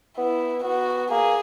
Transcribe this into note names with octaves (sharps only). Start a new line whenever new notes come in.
B3 E4
B3 F#4
A#3 G#4